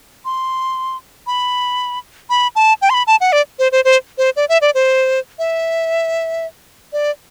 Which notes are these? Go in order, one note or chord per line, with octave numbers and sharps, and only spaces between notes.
C6
B5
B5
A5
G5
C6
B5
A5
F#5
D5
C5
C5
C5
C5
D5
E5
D5
C5
E5
D5